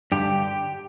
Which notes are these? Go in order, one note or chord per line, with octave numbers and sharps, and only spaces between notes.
G2 D3 G4